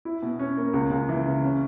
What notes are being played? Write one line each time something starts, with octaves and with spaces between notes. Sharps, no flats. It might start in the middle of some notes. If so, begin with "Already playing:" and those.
E4
B2
C#4
A#3
C#2
C#2
E3
C#3
C#4